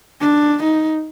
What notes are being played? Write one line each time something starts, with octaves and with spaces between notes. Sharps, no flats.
D4
D#4